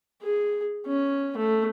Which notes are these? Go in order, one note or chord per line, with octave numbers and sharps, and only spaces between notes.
G#4
C#4
A3